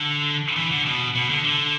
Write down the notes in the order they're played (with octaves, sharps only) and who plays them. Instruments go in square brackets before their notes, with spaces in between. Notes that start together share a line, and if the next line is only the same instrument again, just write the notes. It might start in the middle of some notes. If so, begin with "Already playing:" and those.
Already playing: [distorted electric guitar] D3
E3
D3
B2
B2
D3
D3